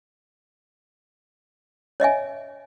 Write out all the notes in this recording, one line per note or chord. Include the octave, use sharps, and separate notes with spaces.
C#5 D#5 E5 G#5